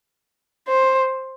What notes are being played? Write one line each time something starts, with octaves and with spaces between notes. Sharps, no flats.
C5